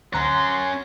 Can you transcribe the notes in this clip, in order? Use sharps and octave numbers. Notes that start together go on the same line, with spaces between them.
D2 C#4 F#5 A#5 C6